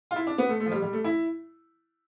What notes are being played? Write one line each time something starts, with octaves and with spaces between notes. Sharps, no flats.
F4
E4
D4
B3
A3
A3
F3
G3
G3
A3
E4